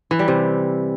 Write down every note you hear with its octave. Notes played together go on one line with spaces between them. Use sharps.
E3
G3
C3